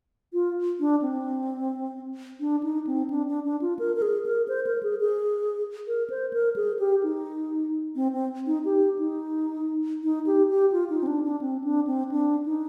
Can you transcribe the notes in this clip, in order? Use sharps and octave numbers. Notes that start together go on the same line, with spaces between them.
F4
D4
C4
D4
D#4
C4
D4
D4
D4
F4
A#4
A#4
G#4
A#4
C5
A#4
G#4
G#4
A#4
C5
A#4
G#4
G4
D#4
C4
C4
D#4
G4
D#4
D#4
G4
G4
F4
D#4
C4
D4
D4
C4
D4
C4
D4
D#4